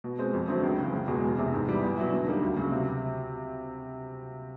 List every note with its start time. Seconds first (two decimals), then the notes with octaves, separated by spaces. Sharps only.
0.04 B2
0.18 G#3 C4
0.33 F2
0.48 D3 F#3 A3 C4
0.63 C#2
0.78 C#3 E3
0.93 F#1
1.08 E2 B2 G#3
1.23 E1
1.38 E2 C3
1.53 G#2
1.68 E3 G3 B3
1.83 E2
1.97 B2 F#3 B3 E4
2.12 D3
2.27 G3 A#3 D#4
2.42 D2
2.56 C#3 F#3
2.72 C3